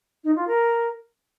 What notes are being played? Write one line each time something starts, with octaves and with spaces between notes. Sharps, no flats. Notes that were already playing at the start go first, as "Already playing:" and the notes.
D#4
F4
A#4